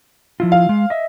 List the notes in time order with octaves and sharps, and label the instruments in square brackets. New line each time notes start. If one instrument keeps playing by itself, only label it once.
[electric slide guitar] F3 E4 F4
[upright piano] F5
[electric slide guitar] G#3
D#5 E5